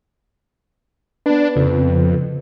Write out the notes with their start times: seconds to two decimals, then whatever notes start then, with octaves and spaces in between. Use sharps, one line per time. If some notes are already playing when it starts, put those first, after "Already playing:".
1.26 B3 D4 B4
1.56 F2 C#3